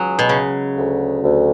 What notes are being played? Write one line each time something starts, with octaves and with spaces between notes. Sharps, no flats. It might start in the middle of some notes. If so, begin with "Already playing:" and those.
Already playing: C#2 F#3 G#4
B2
C#3 G#3
D2
D2